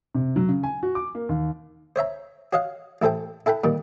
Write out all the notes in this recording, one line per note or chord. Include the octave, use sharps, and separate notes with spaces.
C3
F#3
C#3
G#5
F#4
D6
A#3
D#2
C5 C#5 E5 A#5
F#4 C#5 D#5 F5 F#5
A1 E4 A4 C5 G5
E4 A4 F#5 G5 B5
A#2 D#3 G3